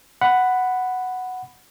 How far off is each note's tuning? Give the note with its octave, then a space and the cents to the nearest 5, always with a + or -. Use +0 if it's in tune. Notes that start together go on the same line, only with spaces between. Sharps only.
F#5 +0 B5 +10